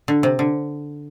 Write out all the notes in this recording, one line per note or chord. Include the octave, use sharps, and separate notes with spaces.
D3
C3
D3